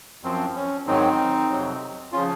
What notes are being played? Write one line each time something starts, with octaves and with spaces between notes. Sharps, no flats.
F#2 F3 C4
C#4
G#2 D#3 F#3 C4 D#4
F2 C3 F#3
C#3 F3 C#4 F4